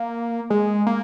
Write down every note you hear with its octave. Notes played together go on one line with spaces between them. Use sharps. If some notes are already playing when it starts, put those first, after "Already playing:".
Already playing: A#3
G#3
A#3